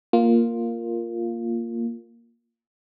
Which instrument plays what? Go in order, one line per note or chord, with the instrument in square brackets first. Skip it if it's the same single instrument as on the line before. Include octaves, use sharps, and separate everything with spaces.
[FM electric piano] A#3 F4